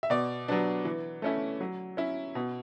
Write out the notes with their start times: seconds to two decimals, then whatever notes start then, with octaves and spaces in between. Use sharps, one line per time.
0.03 E5
0.10 B2 D5
0.48 F#3 B3 D4
0.85 E3
1.22 A3 C#4 E4
1.60 F#3
1.97 C#4 E4
2.35 B2